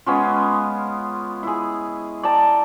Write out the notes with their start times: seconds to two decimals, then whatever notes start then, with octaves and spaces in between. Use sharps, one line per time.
0.06 G#3 B3 C#4 F4
1.43 E4 G#4
2.23 D5 G5 A5 A#5